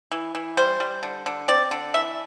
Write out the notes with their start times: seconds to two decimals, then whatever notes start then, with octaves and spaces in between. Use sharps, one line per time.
0.12 E3
0.35 E3
0.57 G3 C5
0.80 G3
1.03 D3
1.26 D3
1.48 C4 D5
1.71 D3
1.94 E3 E5